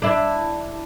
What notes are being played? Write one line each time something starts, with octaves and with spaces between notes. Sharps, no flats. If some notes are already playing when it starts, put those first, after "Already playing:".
D4 E4